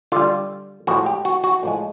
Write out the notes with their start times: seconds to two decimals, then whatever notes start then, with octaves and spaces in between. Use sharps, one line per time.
0.12 D3 G3 F4
0.87 A2 F3 G#3 F#4
1.06 G4
1.25 F#4
1.44 F#4
1.63 A2 F3 G#3